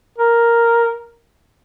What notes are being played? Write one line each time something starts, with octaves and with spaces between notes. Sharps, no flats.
A#4